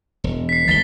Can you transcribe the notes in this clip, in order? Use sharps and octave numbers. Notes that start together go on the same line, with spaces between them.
E1
B6 C7
G1 A6 B6 G7